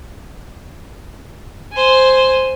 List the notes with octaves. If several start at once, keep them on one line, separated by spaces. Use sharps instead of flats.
C5 G#5